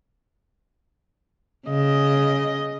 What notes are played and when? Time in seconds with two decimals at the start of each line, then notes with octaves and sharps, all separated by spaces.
1.68 C#3 D#5